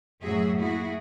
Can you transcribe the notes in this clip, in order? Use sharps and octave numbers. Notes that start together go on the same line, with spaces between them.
F#2 A2 F#3 F#4 G#4 E5
A#3 E4 F#4 G#4